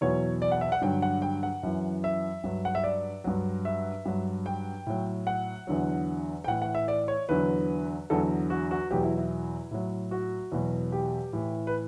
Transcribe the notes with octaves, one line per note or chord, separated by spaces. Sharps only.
E2 B2 F#3 C#5
D5
F#5
E5
F#5
G2 D3 F#3 G5
F#5
G5
F#5
F#2 E3
E5
G2 F#3
F#5
E5
D5
G2 F#3
E5
G2 F#3
G5
A2 F#3
F#5
E2 D3 F#3
G5
A2 E3 F#5
F#5
E5
D5
C#5
E2 D3 F#3 B4
E2 D3 F#3 A4
F#4
F#4
E2 B2 F#3 G4
E4
E4
A2 F#3
F#4
E2 B2 F#3
G4
A2 E3
B4